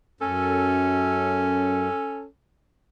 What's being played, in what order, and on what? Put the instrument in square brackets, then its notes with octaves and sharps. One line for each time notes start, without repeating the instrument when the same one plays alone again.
[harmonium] F#2 [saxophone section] C#4 A4